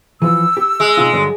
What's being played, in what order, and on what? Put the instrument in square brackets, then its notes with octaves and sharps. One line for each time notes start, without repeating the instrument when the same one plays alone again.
[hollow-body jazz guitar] E3 F3 [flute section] E6
[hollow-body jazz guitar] G4
[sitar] G#3
[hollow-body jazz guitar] C3 D#4 F4
G2 D3 F#3